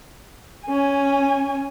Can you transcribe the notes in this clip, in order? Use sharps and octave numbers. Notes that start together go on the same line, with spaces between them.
C#4 G#5